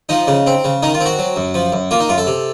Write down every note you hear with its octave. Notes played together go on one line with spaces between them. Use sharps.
F3 D#4
C#3
C4
C#3
D#3 D#4
F4
C4
F#4
F#3
F#2
F3
F#2
A#3 F4
D#4
F#2 F4
A4
C3